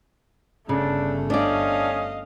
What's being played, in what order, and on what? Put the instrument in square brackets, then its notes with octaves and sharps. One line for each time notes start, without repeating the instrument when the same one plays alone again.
[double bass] G1 A3 [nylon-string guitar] C#3 [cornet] D4
[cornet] C#4 [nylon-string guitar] D4 D5 [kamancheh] D#5 F5